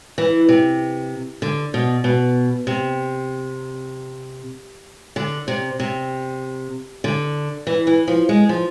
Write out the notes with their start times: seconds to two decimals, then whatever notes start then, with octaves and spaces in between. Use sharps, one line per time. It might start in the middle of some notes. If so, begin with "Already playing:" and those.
0.18 E3
0.49 C3
1.42 D3
1.74 B2
2.04 B2
2.67 C3
5.16 D3
5.48 C3
5.80 C3
7.04 D3
7.67 E3
7.87 E3
8.08 F3
8.29 G#3
8.49 F3